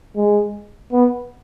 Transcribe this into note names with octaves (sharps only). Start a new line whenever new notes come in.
G#3
B3